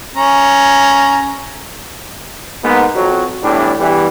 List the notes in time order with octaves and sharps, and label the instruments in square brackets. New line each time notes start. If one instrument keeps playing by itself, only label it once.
[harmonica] C#4 A#5
[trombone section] G#2 A#3 B3
F2 F#3
E2 A2 E3 G3 D4
E2 E3 G3